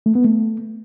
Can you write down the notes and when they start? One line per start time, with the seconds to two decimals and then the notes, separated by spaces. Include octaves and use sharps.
0.06 A3
0.15 B3
0.25 A3